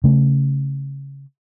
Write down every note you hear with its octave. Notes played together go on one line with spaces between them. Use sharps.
C#3 A3